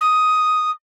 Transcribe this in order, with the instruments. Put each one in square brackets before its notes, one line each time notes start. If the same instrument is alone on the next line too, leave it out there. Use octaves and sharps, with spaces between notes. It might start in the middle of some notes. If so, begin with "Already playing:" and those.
[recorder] D#6